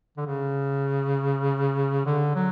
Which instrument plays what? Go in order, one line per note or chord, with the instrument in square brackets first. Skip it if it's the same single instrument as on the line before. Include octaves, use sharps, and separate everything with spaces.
[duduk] D3
C#3
D3
F#3